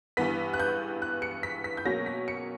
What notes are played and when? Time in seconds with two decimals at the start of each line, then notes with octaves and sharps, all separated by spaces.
0.17 G2 E3 B3 B6
0.54 F#6
0.59 G6
1.02 F#6
1.22 C#7
1.43 B6
1.64 B6
1.77 G6
1.85 B2 F#3 A#3 C#4 A#6
2.06 B6
2.28 C#7